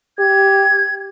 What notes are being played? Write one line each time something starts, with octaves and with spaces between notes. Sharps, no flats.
G4 G#6